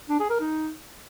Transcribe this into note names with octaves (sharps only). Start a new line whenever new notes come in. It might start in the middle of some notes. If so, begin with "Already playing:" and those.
D4
G#4
A#4
D#4